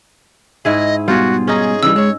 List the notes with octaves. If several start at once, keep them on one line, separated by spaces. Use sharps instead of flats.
G#2 E4 G#4 D#5
B2 G3 F4 F#4 G#4
C#4 D#4 G#4
C#3 E3 G3 E6
G#3 C#5